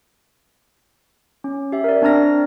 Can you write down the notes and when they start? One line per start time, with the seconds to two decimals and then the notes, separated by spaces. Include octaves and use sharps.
1.44 C#4
1.72 G4 E5
1.84 A#4 D5
2.02 C4 D4 D5 A#5 F6 A#6